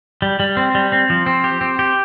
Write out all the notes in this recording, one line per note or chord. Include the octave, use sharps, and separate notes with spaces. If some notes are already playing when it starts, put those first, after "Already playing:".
G3
G3
C4
G3
C4
F3
C4
G4
C4
G4